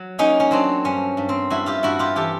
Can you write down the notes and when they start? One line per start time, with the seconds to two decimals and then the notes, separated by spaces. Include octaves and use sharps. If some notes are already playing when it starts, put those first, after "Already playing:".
Already playing: F#3
0.19 A#3 C#4 D#4
0.40 C#4
0.51 F#3 C4 D4
0.85 G2 C#4
1.17 G2
1.29 C4
1.50 G2 E4 F#4
1.66 F4 G4
1.83 G2 E4 F#4
1.99 F4 G4
2.16 E3 G4 A4